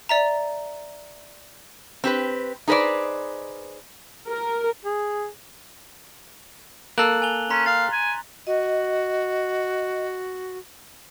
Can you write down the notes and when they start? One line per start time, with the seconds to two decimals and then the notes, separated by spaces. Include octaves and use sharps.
0.09 D5 E5 A#5
2.04 C4 G4 B4
2.68 D#4 G#4 B4 C5 D5
4.28 A#4
4.85 G#4
6.98 A#3 A4 F#6 F#7
7.22 G#5 F7 G7
7.50 C#4 A#5 C6 B6
7.66 F5 A6
7.92 G#5
8.47 F#4 D#5